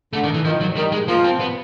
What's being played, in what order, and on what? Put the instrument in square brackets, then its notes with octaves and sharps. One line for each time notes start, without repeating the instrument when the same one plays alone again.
[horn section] D3 [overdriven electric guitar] A3
[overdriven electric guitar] D#3
E3
[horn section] D#3 [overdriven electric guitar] F3
[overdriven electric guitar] F#3
[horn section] D#3 [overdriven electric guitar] G3
[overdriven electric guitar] G#3
[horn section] F3 [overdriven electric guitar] A#3
[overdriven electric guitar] C4
B3